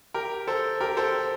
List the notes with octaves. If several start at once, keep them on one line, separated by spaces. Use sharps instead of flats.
G4 A#4
A4 C5
G4 A#4
A4 C5